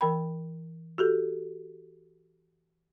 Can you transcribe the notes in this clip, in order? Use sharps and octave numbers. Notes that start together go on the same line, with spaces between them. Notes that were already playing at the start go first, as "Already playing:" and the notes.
E3 A#4 G5 B5
F#4 G4 A4